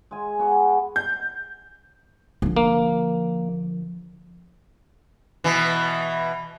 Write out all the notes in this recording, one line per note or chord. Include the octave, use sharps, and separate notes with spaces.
G#3 G#5
B3 F#4 G#4
G6
D3 F3
A#3
B2 E3